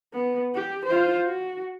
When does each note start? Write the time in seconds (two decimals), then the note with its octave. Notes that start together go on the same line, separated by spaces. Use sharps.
0.13 B3
0.55 G4
0.86 F4 C5
1.26 F#4